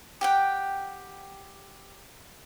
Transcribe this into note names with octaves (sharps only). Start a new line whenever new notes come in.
G4 F#5 G5